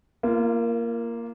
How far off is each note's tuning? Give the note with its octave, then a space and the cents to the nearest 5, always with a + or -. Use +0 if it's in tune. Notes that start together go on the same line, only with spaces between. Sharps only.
A#3 +0 F4 -35